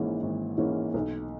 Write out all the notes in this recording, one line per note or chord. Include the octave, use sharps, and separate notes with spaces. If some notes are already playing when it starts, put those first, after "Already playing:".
Already playing: G#1 G#2 E3 A#3 C#4
G#1
G#2 E3 A#3 C#4
B1